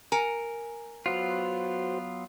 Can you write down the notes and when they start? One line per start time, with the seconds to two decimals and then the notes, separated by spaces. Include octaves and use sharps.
0.12 A#4 G#5 A#5
1.06 F#3 B3 F4 F#4 C5